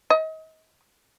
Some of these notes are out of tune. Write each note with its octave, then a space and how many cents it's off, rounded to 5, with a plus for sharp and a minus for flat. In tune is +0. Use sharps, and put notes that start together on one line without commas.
D#5 +35